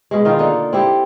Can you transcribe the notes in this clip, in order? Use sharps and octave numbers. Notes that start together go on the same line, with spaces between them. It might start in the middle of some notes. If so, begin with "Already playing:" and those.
B2 G#3
D#3 D#4 F4
D3 A#3 D#4 A4
C4 E4 G4 A4